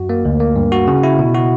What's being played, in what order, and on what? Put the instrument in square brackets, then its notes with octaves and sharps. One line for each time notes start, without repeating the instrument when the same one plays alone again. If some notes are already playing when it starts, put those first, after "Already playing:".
Already playing: [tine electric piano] F#2 F#4
A#3
D2
A#3
G2
F#4
C#3
E4
B2
F#4